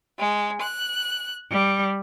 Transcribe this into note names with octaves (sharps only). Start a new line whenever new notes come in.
G#3
F#6
G3